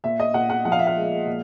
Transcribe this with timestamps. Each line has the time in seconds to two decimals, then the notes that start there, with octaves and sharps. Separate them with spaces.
0.04 A#2 E5
0.20 D#5
0.34 A#2 F#5
0.50 F#5
0.65 F3 F#5
0.72 F5
0.79 E5
0.87 F5
0.97 G#3
1.27 A#2